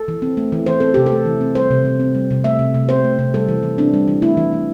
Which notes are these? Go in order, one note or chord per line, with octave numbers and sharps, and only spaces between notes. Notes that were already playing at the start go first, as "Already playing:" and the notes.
Already playing: A4
E3
C4
A3
E3
E3 C5
C4 A4
C3 G4
A4
A3
E3
C4
G3 C5
C3
C3
C4
G3
C3
A3 E5
C3
C3
C4 C5
A3
C3
G3 A4
E3
E3
C4 D4
G3
E3
A3 E4
E3
E3